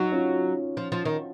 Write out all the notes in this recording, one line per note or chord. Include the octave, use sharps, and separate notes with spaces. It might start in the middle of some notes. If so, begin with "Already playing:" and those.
Already playing: F#3 D#4 F#4
C#4 F4
F3
F3
D#3